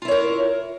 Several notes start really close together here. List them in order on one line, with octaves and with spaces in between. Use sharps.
F4 E4 C#5 A#4